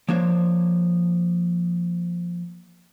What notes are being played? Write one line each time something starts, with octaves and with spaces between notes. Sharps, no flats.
F3 A#3 D4 C5 C#5